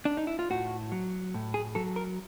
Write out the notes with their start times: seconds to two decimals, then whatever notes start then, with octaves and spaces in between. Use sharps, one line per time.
0.05 D4
0.17 D#4
0.27 E4
0.39 F4
0.50 A2 F#4
0.92 F#3
1.34 A2
1.54 G#4
1.75 F#3 A4
1.96 A#4